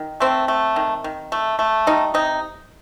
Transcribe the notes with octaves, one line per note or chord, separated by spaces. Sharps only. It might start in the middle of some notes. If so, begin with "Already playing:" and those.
Already playing: D#3
A3 C4
A3
D#3
D#3
A3
A3
G3 D#4
C3 D#4